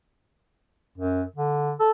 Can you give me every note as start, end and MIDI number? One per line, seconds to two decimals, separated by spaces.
0.98 1.23 42
1.36 1.72 50
1.79 1.91 69